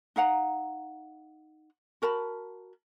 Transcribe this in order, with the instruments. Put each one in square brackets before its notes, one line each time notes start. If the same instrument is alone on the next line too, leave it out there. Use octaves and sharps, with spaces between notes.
[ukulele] D#4 F5 F#5 A#5
F#4 A#4 A5 B5